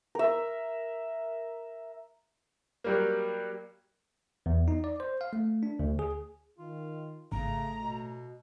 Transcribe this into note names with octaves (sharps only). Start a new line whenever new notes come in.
A#4 E5
F#3 G3 A#3
E2
D#4
D5
C5
F5
A3
D4
D2
G#4
D#3 F4
G#1 A2 C#3 A3 A#5
B2